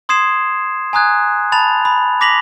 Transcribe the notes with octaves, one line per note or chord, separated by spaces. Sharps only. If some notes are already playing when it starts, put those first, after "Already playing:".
C6 D#6 G#6 C7 E7
G#5 A#5 D#6 F#6 G#6
A5 B5 A6 F7
B5
D6 A#6 B6 F7 F#7